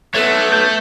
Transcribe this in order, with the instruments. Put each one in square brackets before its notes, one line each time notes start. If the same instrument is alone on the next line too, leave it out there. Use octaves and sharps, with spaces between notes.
[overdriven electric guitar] A3 [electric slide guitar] B3 B4 C#5 [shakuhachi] A4
[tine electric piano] G6